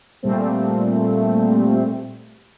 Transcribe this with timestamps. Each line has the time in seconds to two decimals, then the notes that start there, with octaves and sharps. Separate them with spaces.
0.23 A#2 G3 A3 C4